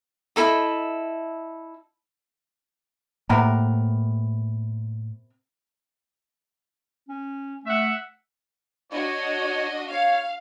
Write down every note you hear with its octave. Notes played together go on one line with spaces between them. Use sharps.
E4 A4 D#5
A2 C3 A#3 B3 A#4
C#4
A3 E5 F#5
D4 F#4 C#5 D#5
C#5 F5